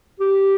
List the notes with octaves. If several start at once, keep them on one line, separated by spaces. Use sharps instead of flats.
G4